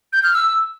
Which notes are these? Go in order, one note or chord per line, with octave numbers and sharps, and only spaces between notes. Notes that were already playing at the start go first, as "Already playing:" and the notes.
G6
F6
E6